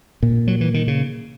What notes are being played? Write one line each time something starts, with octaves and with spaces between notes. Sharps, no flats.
A#2
F#3
E3
D#3
C#3